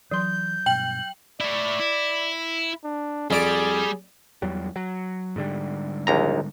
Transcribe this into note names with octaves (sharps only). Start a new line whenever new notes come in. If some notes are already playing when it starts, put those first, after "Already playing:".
E3 F#3 C6 G6
G2 B2 G5 F#7
A3 E4 D5
E4
D4
F2 G3 G#4 D5 D6
E2 F#3 G3
F#3
G#2 D3 G3
A#1 D#2 A#5